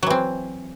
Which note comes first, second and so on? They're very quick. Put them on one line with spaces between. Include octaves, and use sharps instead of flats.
F#3 E3 C4